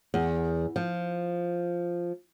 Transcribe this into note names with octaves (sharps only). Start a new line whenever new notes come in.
E2
F3